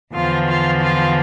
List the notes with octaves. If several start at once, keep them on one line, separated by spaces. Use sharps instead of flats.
E2 D3 F3 F4
F4
F4